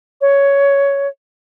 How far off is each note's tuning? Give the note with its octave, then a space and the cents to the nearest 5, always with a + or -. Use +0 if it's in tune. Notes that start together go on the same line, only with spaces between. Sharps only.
C#5 +10